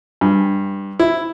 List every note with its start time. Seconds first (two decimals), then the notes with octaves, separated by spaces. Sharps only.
0.21 G2
1.00 E4